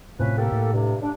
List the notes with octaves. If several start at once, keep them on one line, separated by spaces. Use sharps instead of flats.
A2 C3 F3 C#4 B4
A#3 G4 A4
A2
G2 C3
D4